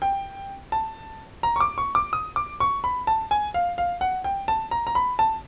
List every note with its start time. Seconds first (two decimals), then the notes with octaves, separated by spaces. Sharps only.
0.02 G5
0.72 A5
1.43 A#5
1.56 C#6
1.60 D6
1.78 C#6
1.95 D6
2.13 D#6
2.36 D6
2.60 C#6
2.84 B5
3.07 A5
3.31 G#5
3.54 F5
3.78 F5
4.01 F#5
4.24 G5
4.48 A5
4.71 A#5
4.87 A#5
4.95 B5
5.19 A5